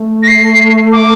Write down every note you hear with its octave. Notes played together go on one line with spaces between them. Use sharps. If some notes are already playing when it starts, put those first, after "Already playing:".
Already playing: A3
A#6
C7
D6